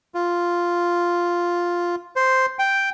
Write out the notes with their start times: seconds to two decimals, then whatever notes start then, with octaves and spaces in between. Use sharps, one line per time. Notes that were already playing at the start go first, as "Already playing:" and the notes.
0.15 F4
2.16 C5
2.59 G5